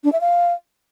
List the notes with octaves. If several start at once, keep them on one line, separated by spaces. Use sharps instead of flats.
D4
E5
F5